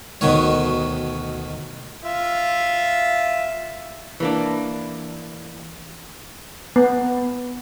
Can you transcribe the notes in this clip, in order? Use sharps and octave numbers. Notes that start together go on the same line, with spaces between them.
D2 B2 D#3 C#5
F4 E5
E3 A#3 D4
B3